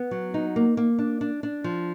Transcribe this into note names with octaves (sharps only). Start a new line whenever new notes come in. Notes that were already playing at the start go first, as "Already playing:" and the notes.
Already playing: B3
F#3
D#4
A#3
A#3
D4
D4
D4
F3